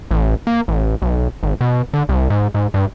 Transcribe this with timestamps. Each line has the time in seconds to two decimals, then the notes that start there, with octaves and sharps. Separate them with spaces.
0.11 A1
0.47 A#3
0.68 A1
1.02 B1
1.43 G#1
1.61 B2
1.94 D3
2.09 C2
2.30 G#2
2.54 G#2
2.74 G2